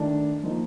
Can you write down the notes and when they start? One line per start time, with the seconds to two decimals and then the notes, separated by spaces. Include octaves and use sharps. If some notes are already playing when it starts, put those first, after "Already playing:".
Already playing: D#3 A3 D4
0.43 F3 A#3 D#4